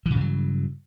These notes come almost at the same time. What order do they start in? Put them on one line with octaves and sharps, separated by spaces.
E3 C#3 G2 F#3